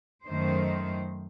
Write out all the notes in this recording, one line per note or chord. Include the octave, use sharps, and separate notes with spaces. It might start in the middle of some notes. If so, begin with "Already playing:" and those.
F#2 D#3 A3 C5